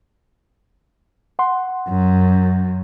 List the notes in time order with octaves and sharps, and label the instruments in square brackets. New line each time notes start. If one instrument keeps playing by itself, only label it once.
[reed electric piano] F#5 C6
[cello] F#2